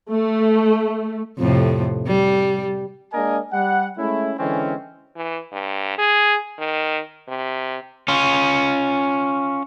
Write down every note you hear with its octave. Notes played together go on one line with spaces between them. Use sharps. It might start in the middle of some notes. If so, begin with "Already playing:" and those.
A3
F2 A2 C3
G3
G#3 A#3 D4 A#4 D#5 G#5
G3 F#5
G#3 A3 C#4 E4
D3 E3 G#3 C4 C#4
E3
G2
G#4
D#3
C3
C#4 F4